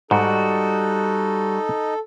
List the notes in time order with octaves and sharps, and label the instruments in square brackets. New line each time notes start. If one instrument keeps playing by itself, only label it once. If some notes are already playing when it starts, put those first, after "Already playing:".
[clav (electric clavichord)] G#2 [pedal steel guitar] G3 F#4 [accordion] D#4 D#5 [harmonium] A4